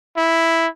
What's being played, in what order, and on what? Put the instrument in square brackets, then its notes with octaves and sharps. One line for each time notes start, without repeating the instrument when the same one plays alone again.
[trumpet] E4